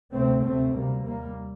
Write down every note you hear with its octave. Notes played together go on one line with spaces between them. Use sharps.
D2 C3 A3 C4
D2 C3 A3 C4
D2 C3 G3 A#3
D#2 G3 A#3